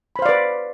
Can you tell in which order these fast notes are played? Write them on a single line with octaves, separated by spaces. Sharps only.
B5 C5 F5 D5 B4